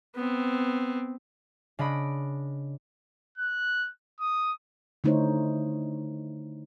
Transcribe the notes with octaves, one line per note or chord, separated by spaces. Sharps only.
B3 C4
C#3 D4 D#5 B5 D7
F#6
D#6
D3 A3 D#4 E4 C5 C#5